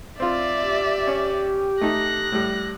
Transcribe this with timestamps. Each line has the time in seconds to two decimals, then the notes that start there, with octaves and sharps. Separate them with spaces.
0.20 C4 F4 D5 E5
0.61 G4
1.07 C#4
1.81 A3 D#4 F#6 A#6
2.32 A2 G3